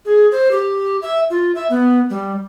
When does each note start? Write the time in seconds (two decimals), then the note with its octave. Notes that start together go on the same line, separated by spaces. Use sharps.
0.05 G#4
0.31 C5
0.51 G4
1.02 E5
1.30 F4
1.55 E5
1.70 B3
2.10 G3